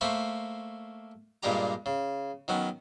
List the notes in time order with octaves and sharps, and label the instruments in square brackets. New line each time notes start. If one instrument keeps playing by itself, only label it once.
[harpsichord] A3 A#3 C5 B5 C#6
G2 A#2 G3 G#3 G4 A#5
C#3
D#3 F#3 B3 C#4